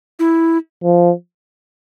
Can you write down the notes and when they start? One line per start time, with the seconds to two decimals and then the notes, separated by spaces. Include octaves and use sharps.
0.19 E4
0.83 F3